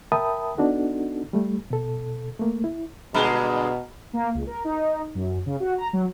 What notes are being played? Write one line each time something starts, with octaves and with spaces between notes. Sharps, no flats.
A#4 E5 G5 A5 B5 D#6
B3 D4 D#4 F#4 A4
G3 A3
B2 A4
A3 A#3
E4
G2 B2 D3 G#3 A#5 B5 F6
A#3
C#2
A#4
D#4
F#2
C#3
F#4
A#5
F#3